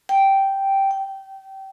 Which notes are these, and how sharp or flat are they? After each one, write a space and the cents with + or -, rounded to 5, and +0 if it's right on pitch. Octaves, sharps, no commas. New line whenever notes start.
G5 -5
G5 -20